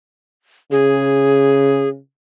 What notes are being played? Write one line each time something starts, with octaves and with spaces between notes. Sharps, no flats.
C#3 G#4